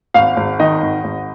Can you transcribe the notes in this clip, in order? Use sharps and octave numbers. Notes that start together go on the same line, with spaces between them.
G#1 F5
G#1
D#3 D#5
G#1
G#1